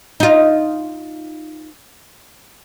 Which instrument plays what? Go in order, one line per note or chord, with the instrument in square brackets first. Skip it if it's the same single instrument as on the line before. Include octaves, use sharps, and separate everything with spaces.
[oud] D#4 F4